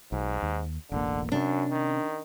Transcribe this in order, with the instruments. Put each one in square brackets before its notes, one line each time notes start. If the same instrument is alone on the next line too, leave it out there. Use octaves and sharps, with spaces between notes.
[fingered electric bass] B1 [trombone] G#2
[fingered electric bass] D#2
[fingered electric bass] E1 A1 A#3 [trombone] D3
[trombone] F#2 [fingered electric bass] C3 C#4 [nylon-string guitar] D4
[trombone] D#3